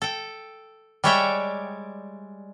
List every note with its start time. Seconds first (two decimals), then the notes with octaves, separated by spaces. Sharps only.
0.02 A4 G5
1.04 G3 G#3 C#5 D5 E5 G5